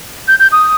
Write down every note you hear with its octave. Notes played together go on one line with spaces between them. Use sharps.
G6
G6
D#6